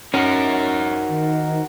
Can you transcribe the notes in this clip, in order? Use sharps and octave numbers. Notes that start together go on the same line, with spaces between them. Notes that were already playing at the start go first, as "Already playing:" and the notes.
C#4 D#4 F#4 A#4 C5
D#3